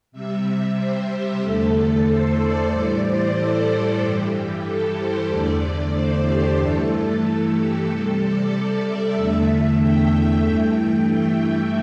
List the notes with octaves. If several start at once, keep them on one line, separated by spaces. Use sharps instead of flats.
C3 G3 E5
C5
G4
E2 D3 A3 A4
C5
D5
A2 E3 G3
C5
A4
G2 E3 G3 G4
A4
C5
E2 D3 A3 D5
C5
G4
G2 E3 A3 A4
A4
G4
C3 G3 A4
D5
E5
E2 D3 A3 E5
E5
G5
G5
G2 E3 A3
E5
G5